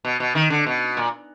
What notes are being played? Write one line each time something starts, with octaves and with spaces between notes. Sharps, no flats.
B2
B2
D#3
D3
B2
A#2